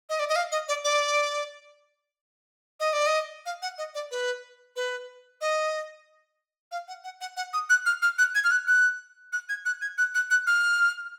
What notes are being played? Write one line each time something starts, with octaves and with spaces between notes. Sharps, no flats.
D#5
D5
D#5
F5
D#5
D5
D5
D#5
D5
D#5
F5
F#5
D#5
D5
B4
B4
D#5
F5
F#5
F#5
F#5
F#5
D#6
F#6
F6
F6
F#6
G#6
F6
F#6
F#6
F#6
G#6
F#6
G#6
F#6
F#6
F#6
F6